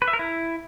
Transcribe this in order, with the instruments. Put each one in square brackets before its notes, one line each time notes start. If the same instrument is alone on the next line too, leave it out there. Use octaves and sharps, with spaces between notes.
[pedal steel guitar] B4
E5
A#4
E4